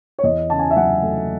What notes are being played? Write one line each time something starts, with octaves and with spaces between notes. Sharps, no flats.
C#5
E2 D#5
C#3 A5
G#5
E5
F#3 F#5
A3